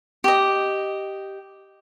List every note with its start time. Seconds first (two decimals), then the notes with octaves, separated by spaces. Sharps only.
0.24 G4 D#5